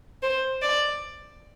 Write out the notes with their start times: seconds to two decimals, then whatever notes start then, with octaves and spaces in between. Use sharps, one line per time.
0.23 C5
0.62 D5